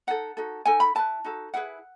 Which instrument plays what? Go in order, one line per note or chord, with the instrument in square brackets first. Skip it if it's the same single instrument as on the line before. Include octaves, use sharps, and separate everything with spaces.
[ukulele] D#4 A4 F#5
D#4 F#4 A4
D#4 A4 G#5
B5
E4 B4 A5
D#4 F#4 A4
E4 G#4 B4 F#5